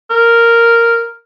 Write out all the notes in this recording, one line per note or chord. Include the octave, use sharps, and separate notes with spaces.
A#4